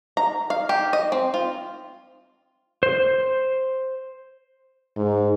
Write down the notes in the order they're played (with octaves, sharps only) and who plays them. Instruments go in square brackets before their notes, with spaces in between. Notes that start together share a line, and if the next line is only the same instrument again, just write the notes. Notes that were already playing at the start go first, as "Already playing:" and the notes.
[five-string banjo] A#5
F5
G4
D#5
C4
F4
[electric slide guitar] C5
[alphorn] G#2